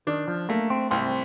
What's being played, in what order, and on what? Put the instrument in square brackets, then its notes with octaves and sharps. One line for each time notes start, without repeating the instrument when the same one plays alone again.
[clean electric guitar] D#3 [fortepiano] D4
[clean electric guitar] F3
[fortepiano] A3 [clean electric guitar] A#3
[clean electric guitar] C4
[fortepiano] C2 [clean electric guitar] C4